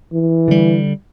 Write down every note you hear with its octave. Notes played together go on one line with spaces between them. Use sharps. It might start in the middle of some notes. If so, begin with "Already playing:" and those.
E3
D3 G3